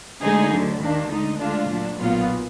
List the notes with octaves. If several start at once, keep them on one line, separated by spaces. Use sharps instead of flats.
D2 D3 G#3 D#4 G#4
D2 D3 F#3
D#2 D#3 A#3 D4
D2 D3 G#3 D#4
D2 D3 G#3 D4 F4
A#2 F#3 D4
B1 A#2 F#3 B3 F4